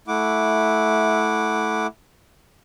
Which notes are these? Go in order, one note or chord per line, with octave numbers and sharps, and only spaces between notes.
A3 E4 F#5 D6